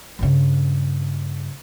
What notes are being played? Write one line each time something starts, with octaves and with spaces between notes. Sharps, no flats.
G2 C#3